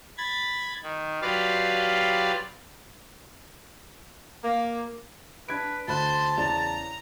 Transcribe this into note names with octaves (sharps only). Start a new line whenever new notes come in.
B5 G#6 A6
D#3
F#3 F4 G4 B4 D5 F5
A#3
D4 B4 G#6 D7
D2 C5 A5 B5 C6 F#6
E2 C#3 D5 A#5